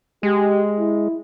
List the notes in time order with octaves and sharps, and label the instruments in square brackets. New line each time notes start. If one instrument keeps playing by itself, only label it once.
[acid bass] G#3 [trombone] G4
[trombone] E4